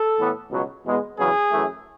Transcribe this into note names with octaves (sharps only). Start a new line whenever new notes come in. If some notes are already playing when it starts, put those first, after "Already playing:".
Already playing: A4
A2 E3 B3
C#2 B2 F#3
E2 B2 G#3 B3
E2 C#3 F#3 B3 G#4
F#2 E3 A3